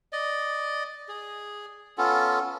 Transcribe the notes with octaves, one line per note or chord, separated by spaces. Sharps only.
D5 D#5
G#4
B3 C#4 F4 A4